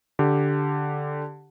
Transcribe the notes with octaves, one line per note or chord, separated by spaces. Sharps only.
D3 G4